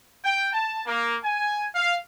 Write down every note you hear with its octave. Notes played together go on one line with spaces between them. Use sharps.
G5
A5
A#3
G#5
F5